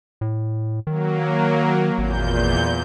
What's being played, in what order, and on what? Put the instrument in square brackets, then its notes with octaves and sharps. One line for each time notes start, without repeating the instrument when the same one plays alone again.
[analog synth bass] A2
[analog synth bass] D#3 [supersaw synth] F#3 A#3
[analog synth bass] G#1 [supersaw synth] E2 A#2 G6